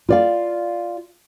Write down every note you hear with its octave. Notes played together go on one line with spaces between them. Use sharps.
F4 D5 F5